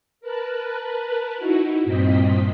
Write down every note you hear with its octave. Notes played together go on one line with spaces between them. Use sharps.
A#4 B4 A5 F#6
D#4 E4 F#4
G2 A#2 C4 D#5 B6